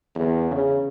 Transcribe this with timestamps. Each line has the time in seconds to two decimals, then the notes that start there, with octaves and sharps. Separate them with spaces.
0.15 E2
0.51 C#3